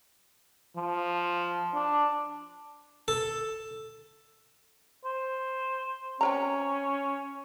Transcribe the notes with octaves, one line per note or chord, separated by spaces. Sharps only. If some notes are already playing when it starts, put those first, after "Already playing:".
F3
D4
A4
C5
C4 C#4 A#4 A#5